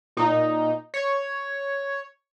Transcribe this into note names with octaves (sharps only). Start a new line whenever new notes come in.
A#2 D#4
C#5